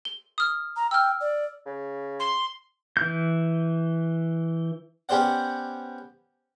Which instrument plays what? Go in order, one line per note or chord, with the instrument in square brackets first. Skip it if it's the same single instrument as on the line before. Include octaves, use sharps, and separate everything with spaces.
[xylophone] G7
D#6 F6
[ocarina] A#5
[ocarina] G5 [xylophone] E6 F6
[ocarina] D5
[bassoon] C#3
[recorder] C6
[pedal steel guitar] E3 G6
[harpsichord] B3 C#4 G4 C5 D5 F#5